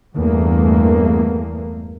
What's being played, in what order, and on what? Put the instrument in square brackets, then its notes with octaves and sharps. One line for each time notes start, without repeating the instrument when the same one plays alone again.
[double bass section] E2 G2 A3 A#3